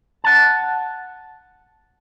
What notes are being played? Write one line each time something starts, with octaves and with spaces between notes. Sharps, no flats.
F#5 A5